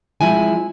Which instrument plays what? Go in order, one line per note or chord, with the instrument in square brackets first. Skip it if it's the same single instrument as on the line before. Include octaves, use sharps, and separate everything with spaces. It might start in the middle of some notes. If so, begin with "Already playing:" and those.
[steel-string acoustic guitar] F3 G#3 C4 E4 G#5